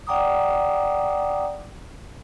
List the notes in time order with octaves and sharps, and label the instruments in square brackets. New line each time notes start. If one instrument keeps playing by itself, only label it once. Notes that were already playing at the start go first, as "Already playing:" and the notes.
[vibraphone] D5 F#5 G5 A#5 D6 D#6